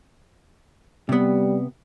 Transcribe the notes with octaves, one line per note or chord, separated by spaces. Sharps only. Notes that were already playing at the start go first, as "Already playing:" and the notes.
C3 G3 B3